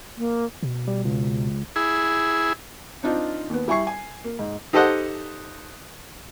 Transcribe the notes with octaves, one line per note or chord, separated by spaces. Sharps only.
A#3
B2
G3
C#2
E4 G#4
C4 D4 D#4 F4
D#2 B3
G3 E4 G#5 C#6 C7
G#5
A#3
G#2
D#4 G4 A4 C5 D#5 F#5